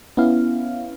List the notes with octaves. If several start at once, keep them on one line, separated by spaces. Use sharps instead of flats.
B3 C#4 E4 F5